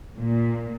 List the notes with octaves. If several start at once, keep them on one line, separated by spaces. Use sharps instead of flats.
A#2